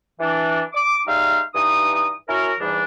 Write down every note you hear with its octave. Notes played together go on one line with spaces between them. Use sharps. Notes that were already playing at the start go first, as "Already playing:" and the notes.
E3 D4
D6
G3 G#3 D#4 E5 F5
G2 E3 D#4 D#6
C#4 E4 F#4 A#4
E2 G#2 E3 G3 D4